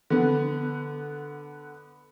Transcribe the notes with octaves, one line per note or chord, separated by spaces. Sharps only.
D3 B3